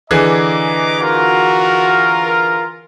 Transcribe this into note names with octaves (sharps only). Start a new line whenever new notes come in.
D3 E3 G#4 D#5 A#5 D6
F4 F#4 A#4